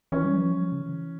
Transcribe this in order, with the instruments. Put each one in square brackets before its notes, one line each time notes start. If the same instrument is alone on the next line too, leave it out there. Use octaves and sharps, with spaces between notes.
[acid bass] E3 [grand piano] C#4
[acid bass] G3
F3
G3
F3
C#3
E3